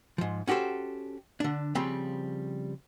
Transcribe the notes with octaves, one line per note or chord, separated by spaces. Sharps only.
G#2 F3
C#4 F#4 G4 A4 C5
D3 D4
C#3 F3 G3 C4